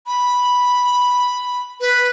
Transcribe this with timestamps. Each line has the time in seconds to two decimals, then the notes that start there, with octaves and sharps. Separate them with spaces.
0.07 B5
1.81 B4